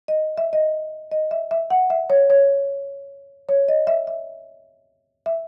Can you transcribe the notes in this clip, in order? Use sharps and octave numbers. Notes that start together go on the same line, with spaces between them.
D#5
E5
D#5
D#5
E5
E5
F#5
E5
C#5
C#5
C#5
D#5
E5
E5
E5